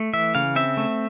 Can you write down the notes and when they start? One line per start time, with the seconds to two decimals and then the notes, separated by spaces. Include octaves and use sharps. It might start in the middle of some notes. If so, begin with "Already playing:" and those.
Already playing: A3
0.13 E3 E5
0.35 C#3 F5
0.56 C4 E5
0.77 A3